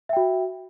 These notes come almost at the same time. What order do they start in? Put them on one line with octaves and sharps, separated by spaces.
E5 G5 F#4